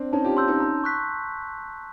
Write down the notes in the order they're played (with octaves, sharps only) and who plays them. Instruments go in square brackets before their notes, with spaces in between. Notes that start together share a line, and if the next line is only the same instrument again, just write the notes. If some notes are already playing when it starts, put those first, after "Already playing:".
Already playing: [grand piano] C4 D4
[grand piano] C#4 D#4 [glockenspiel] A5
[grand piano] F4 G4
[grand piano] D#4 F4 [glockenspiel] C6 E6 G6
[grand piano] C#4 D#4
[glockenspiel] A#5
C#6 F#6 B6